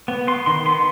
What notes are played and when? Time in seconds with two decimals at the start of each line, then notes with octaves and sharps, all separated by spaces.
0.08 B3
0.27 B3 C6
0.46 D#3 C6
0.66 B3 C6